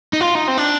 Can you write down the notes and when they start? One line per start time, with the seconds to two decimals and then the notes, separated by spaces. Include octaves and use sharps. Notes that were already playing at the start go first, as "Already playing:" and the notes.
0.13 D#4
0.21 F4
0.35 D#4
0.48 C4
0.57 D4